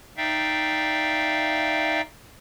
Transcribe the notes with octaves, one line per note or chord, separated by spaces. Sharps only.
D#4 D5 E5 F5 G5